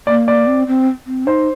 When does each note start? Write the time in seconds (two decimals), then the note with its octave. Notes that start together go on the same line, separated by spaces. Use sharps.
0.07 A#3 D5
0.28 D5
0.47 C4
0.67 C4
1.07 C4
1.27 D#4 C5